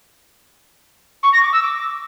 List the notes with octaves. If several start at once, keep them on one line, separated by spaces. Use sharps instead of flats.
C#6
A#6
D6
E6
D6